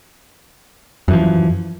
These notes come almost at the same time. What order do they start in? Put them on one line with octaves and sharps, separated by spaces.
F#2 E3 F3